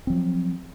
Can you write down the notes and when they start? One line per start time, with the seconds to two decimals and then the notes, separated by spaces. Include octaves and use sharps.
0.07 C4
0.10 F3
0.12 F#3